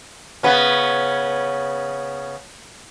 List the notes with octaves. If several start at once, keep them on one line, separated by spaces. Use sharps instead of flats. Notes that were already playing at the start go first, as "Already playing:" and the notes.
C#3 B3 C#4